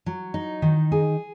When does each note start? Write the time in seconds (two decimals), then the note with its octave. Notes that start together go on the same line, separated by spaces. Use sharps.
0.06 F#3
0.34 D#4
0.62 D#3
0.92 G#4